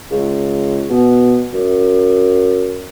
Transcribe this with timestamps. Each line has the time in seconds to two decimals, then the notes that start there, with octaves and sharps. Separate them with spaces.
0.11 C#2
0.89 B2
1.53 F#2